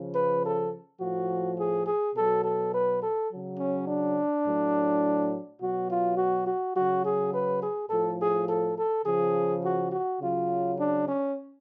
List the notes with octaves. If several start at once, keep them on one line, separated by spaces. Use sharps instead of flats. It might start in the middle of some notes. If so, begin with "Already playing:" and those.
Already playing: C#3 F3
B4
A4
A2 F3 F#4
G#4
G#4
B2 F#3 A4
A4
B4
A4
C#3 F#3
C#4
D4
A2 F#3
B2 F#3 F#4
F4
F#4
F#4
C#3 F#3 F#4
G#4
B4
G#4
A2 F3 A4
G#4
A4
A4
C#3 F3 G#4
F#4
F#4
C#3 F#3 F4
D4
C#4